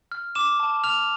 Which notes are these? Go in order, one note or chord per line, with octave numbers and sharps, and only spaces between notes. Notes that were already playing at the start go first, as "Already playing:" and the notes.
F6
D6 E7
A5
F6 F7